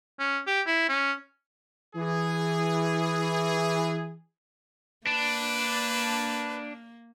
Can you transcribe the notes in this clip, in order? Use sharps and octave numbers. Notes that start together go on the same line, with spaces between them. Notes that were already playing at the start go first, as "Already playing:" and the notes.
C#4
G4
E4
C#4
E3 G#4
A#3 D4 B4